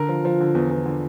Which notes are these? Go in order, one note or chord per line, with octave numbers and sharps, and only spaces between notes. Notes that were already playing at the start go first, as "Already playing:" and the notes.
Already playing: D3 A#4
F3
F3
D3
E2
E2
D3